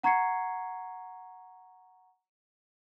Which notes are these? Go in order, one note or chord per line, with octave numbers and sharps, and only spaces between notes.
F#5 A#5 C#6 G#6 C7 C#7